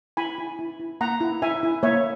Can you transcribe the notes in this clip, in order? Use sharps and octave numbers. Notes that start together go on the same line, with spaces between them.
E4 G#5 B5
E4
E4
E4
A#3 F#5 A#5
E4
E4 E5 G#5
E4
A#3 C#5 E5